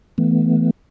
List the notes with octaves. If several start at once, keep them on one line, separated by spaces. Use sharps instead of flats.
E3 A3 B3